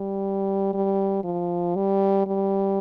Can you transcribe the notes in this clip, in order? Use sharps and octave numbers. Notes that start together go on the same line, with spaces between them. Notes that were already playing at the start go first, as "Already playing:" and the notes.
Already playing: G3
G3
F3
G3
G3